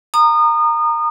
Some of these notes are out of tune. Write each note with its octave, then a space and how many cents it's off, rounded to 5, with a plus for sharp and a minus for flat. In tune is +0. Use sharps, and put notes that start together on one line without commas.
A#5 -15 D#6 -30